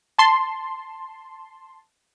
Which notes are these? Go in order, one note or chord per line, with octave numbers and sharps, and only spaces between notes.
A5 C6